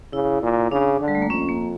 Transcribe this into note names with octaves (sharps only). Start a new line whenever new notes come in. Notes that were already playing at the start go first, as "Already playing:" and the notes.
C#3 E4
A#2
C#3 D4
D3
G3
A3
A#3
F2 C#4
A#3